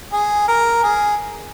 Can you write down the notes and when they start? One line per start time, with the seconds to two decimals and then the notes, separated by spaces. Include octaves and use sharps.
0.12 G#4
0.48 A#4
0.83 G#4